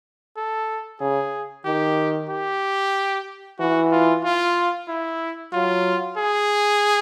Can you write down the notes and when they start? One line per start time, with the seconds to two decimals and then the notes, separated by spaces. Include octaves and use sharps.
0.37 A4
1.01 C#3 G#4
1.65 D#3 G4
2.30 G4
3.59 E3 F#4
3.92 F4
4.24 F4
4.88 E4
5.53 F#3 F4
6.17 G#4